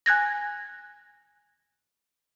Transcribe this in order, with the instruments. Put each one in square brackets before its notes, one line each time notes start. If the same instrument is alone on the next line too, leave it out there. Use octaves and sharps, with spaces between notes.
[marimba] G#5 F#6 G#6 A#6